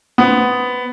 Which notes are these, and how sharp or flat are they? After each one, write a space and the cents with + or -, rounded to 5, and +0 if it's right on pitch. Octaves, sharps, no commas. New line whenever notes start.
B3 +10 C5 +0